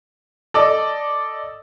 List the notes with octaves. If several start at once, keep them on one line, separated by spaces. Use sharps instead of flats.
A4 D5 D#5